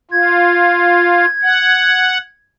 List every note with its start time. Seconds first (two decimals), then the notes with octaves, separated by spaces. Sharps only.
0.11 F4 G#6
1.43 F#5